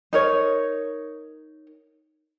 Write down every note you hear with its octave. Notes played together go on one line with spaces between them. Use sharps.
D#4 A#4 C#5